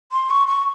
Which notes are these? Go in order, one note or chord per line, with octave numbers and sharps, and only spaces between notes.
C6
C#6
C#6